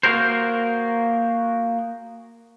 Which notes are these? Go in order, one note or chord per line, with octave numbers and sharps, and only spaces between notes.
A#3 F#4 G#4 A#4 C5